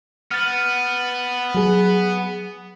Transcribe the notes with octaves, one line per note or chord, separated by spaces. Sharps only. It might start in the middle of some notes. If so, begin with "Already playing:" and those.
B3 F6 A6
F#3 G#4